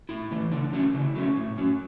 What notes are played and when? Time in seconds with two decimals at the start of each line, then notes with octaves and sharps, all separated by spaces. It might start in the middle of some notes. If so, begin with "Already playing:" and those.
0.09 A2 E4
0.31 E3 A3
0.52 C#3 D4
0.73 F#3 A3 C#4
0.94 C#3 E4
1.15 F#3 A3 C#4
1.37 A2
1.58 F#3 C#4